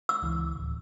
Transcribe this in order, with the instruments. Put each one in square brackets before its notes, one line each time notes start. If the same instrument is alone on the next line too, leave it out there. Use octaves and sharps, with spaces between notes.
[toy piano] E6
[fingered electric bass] C#2 E3
D1